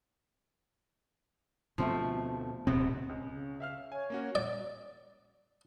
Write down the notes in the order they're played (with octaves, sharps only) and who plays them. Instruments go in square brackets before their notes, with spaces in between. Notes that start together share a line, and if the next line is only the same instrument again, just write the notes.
[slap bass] D2 B2 C4 [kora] F3 A3
[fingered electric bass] D1 B2 C4 [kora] B3
[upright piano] C#2
[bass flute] C#3
[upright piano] E5 F5 F6
[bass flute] C#5 [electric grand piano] G#5
[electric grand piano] A#3 C#4 F#4
[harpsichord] D5